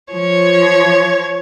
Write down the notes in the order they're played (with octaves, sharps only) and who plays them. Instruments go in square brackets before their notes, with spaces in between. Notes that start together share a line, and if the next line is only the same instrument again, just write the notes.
[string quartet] F3 C#5